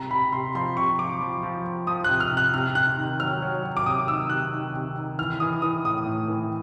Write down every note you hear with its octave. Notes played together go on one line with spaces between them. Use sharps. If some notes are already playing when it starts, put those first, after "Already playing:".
Already playing: C3 A#5
C3 B5
C3 C6
F3 C6
C3 C#6
F3 D6
F3
F3
F3
F3 D#6
C3 F#6
F6
C3
F#6
C3 F6
C3 F#6
D#3
F#3 F6
F#3
F#3
D6
C3 D#6
D#3 E6
C3 F#6
D#3
C3
D#3
E3 F6
E3 D#6
E3 D#6
A2 D#6
A2
E3